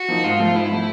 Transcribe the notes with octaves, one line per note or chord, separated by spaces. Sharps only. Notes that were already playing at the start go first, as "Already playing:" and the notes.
Already playing: F#4
F3 A#3 D#4
G#2 F4
F3 A3
G#2 E4
F3 A3